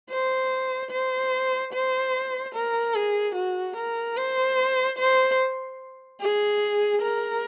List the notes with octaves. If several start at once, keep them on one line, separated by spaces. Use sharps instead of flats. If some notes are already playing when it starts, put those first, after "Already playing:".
C5
C5
C5
A#4
G#4
F#4
A#4
C5
C5
G#4
A#4